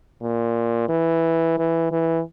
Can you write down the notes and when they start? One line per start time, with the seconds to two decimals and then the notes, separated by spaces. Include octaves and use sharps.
0.22 A#2
0.89 E3
1.58 E3
1.92 E3